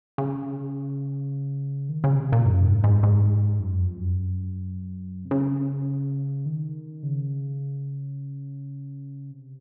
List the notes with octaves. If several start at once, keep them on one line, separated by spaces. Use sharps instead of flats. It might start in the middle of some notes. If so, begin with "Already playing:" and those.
C#3
D#3
C#3
C3
A#2
F#2
G#2
G#2
G#2
F#2
F2
F#2
C3
C#3
D#3
C#3
C3